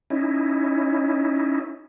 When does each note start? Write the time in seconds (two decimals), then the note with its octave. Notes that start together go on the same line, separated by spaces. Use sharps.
0.10 C#4 D#4 E4